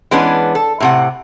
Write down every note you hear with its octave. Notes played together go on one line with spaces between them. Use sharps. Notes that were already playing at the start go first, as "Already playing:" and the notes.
E3 G#3 B3 C#4 D4
A4
A2 C3 F#5